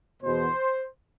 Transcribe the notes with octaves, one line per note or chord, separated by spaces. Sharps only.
E2 B2 C5